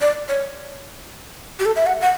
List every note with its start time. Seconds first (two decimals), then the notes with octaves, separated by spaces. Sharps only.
0.01 D5
0.29 C#5
1.60 G4
1.66 A4
1.76 E5
1.86 F#5
2.01 F#5